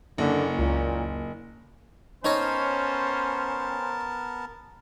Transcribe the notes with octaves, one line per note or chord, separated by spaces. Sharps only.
F#1 D3 A#3 C#4
C#2 A#2
B3 C#4 D#4 A#4 C5 C#5 D#5 A5